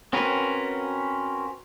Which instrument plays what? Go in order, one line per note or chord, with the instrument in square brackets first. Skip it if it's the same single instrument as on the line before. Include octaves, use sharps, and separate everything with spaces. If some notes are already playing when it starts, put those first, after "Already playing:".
[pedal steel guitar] C4 C#4 F#4 A#4 B4